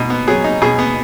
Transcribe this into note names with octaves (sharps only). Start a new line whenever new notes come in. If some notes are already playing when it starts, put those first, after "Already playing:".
Already playing: B2 D#4
B3
F#3 G#4
D#4
B2 G#4
B3